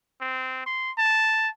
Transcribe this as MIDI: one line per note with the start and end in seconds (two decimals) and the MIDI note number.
0.21 0.63 60
0.66 0.91 84
0.98 1.48 81